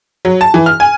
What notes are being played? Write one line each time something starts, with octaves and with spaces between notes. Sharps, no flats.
F#3
A5
E3
F6
G#5